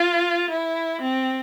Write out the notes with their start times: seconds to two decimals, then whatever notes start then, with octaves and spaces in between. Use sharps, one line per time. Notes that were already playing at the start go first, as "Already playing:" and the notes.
Already playing: F4
0.50 E4
1.01 C4